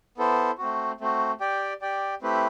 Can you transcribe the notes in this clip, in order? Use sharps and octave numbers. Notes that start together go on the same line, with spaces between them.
B3 E4 A4 C5
A3 C4 F#4
A3 C4 F#4
G4 D5 G5
G4 D5 G5
A3 C4 E4 G4 B4